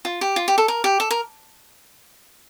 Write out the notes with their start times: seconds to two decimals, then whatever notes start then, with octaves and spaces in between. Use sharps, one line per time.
0.05 F4
0.21 G4
0.36 F4
0.48 G4
0.58 A4
0.68 A#4
0.84 G4
1.00 A4
1.11 A#4